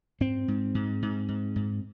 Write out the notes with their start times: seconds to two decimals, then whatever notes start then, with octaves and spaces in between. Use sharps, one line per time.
0.20 G#2 C4
0.48 G#2
0.75 G#2
1.02 G#2
1.29 G#2
1.56 G#2